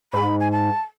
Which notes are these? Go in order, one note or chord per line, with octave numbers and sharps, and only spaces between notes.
G#2 B5
G#5
A5